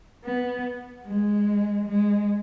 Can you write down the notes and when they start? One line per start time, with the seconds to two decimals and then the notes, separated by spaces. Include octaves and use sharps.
0.24 B3
1.07 G#3
1.88 G#3